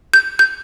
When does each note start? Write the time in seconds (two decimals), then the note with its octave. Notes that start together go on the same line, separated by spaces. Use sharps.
0.14 G6
0.39 G6